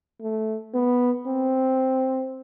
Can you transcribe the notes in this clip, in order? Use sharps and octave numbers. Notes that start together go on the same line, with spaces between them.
A3
B3
C4